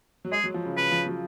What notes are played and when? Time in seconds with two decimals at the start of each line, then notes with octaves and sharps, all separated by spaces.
0.25 F#3
0.32 G#3 G#4
0.44 F#3
0.54 F3
0.65 C#3
0.77 C#3 B4
0.91 F3
1.06 F#3